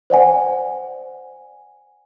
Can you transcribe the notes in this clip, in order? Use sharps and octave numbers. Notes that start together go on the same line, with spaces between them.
C5 D5 F#5 G#5